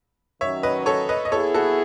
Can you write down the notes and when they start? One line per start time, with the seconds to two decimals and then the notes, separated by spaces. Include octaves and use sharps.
0.41 D#3 F#3 C#4 C#5 E5
0.63 B4 D#5
0.86 A4 C#5
1.09 B4 D#5
1.25 D#5
1.31 B3 E4 G#4 A4 C#5
1.54 F#4 A4